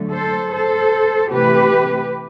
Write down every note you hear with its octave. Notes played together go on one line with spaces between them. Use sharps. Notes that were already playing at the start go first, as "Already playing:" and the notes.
Already playing: D3 F#3 A3
A4 C5
A4 C5
C3 E3 A3 G4 B4